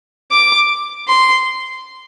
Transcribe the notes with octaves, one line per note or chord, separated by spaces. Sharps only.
D6
C6